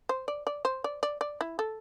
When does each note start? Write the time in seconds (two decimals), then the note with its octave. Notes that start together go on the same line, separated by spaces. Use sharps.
0.09 C5
0.28 D5
0.47 D5
0.65 C5
0.84 D5
1.03 D5
1.21 D5
1.41 E4
1.59 A4